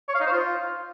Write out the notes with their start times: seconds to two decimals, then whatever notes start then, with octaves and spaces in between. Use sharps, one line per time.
0.09 C#5
0.14 F5
0.20 D#4
0.26 C5
0.32 F4